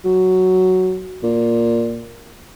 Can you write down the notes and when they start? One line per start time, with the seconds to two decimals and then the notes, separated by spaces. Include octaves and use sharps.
0.05 F#3
1.23 A#2